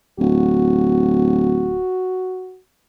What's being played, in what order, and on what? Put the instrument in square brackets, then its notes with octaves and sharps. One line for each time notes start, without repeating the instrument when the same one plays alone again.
[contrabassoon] D1 [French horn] F#4